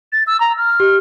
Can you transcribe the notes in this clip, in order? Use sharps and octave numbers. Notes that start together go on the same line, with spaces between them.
A6
E6
A#5
F6
G4